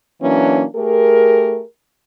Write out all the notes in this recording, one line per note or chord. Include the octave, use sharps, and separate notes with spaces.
E3 F#3 A#3 C#4 D4
A3 G4 G#4 A#4